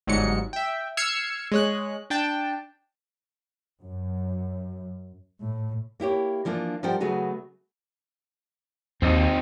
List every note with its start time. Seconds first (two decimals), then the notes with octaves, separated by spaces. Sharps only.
0.07 G1 G#2 F#3 G#3 C#7
0.53 E5 G5
0.97 E6 F6 G#6 C7 C#7
1.52 G#3 C#5 F#6
2.10 D4 G5 A5
3.82 F#2
5.41 A2
6.00 A#3 E4 G4 C#5
6.45 E3 F3 A#3 D4 F4
6.83 F3 G3 A#4 C5 F#5 G5
7.00 C#3 F#3 A3 B3 F#4 G#4
9.02 D#2 C4 D#4